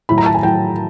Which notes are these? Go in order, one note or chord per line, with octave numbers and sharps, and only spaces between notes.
A2 F#3 B5
A#5
A5
G#5
A2 F#3 G5